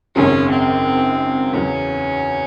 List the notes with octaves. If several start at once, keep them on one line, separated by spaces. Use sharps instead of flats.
G#1 F#2 C#3 F#3 C#4
C4
E2 C#3 F#3 C#4